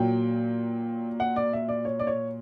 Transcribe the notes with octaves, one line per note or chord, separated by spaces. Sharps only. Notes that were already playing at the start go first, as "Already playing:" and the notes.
Already playing: A#2 F#3 G5
F#5
D5
E5
D5
C#5
D5
C#5